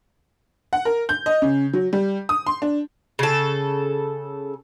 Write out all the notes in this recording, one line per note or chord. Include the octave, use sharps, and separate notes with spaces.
F#5
A#4
G6
D#5
C#3
F#3
G3
D#6
C6
D4
C#3 A4